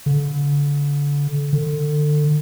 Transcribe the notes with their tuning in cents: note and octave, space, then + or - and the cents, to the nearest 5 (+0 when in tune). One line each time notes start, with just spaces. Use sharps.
D3 -35
D3 +25